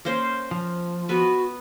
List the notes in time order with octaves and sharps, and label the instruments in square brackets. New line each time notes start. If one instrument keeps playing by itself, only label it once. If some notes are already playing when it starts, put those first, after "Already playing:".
[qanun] A#3 C#4 C5
[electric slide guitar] F3
[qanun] B3 B4 [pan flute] F#4